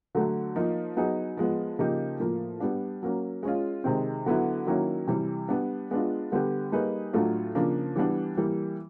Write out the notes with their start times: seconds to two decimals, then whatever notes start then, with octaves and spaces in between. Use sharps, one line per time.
0.15 D3 F#3 A3
0.55 F3 A#3 D#4
0.97 F#3 B3 D#4 G#4
1.37 F3 G#3 B3
1.79 C#3 F3 A#3 D#4 G4
2.20 A2 F3 A#3
2.60 G3 B3 D4
3.03 F#3 A#3 C#4
3.43 G#3 C#4 F4
3.84 C3 D#3 G#3 C4
4.26 D3 F#3 B3 E4
4.67 D#3 F#3 A#3 C#4 E4
5.07 C3 E3 G3
5.49 G3 B3 D4
5.91 G#3 B3 D4 F4
6.32 D3 G3 B3 D4 G4
6.72 G3 A#3 D#4 G#4 B4
7.13 A2 F#3 A3 D4 F4
7.55 C#3 F3 A#3 D4
7.96 E3 G3 B3 D4
8.37 E3 G3 A#3